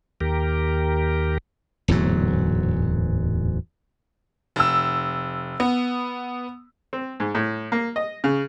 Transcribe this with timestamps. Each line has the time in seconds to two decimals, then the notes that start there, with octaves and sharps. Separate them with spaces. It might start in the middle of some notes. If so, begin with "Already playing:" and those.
0.21 D#2 G4 A#4
1.88 D1 E2 G#2 F#3
4.56 F1 E6
5.60 B3
6.93 C4
7.20 G#2
7.35 A2
7.72 A#3
7.96 D#5
8.24 C#3